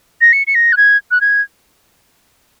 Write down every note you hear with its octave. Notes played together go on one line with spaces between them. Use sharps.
A#6
C#7
C#7
A#6
F#6
G#6
F#6
G#6